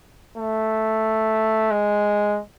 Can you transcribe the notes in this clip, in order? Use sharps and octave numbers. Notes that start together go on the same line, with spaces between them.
A3
G#3